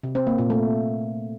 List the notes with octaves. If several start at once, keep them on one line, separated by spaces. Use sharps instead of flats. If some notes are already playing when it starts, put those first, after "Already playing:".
C3
C4
A#3
A#2
A3